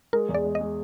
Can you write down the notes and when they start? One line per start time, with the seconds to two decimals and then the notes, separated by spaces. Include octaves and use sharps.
0.13 G#3 A#4
0.29 E2
0.34 D5
0.45 G#3
0.55 D#5
0.61 G#3